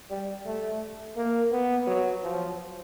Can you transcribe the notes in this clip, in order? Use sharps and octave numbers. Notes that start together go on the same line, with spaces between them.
G3
A3
A#3
B3
F#3
F3